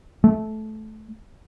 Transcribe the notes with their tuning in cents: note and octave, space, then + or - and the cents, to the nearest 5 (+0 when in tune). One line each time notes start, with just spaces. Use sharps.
A3 -20